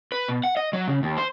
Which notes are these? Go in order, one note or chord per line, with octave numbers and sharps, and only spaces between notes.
B4
B2
F#5
D#5
F#3
C#3
D#2
C5